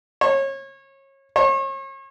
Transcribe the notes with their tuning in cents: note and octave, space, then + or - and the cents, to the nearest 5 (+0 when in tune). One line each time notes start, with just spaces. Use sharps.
C#5 -30
C#5 -40